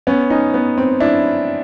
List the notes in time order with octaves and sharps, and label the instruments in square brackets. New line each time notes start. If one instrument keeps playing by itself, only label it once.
[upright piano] B3 C#4
C#4 D#4
B3
C4
D4 E4